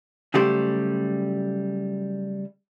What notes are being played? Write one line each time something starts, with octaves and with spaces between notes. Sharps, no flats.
C#3 F#3 G3 A3 G4 C5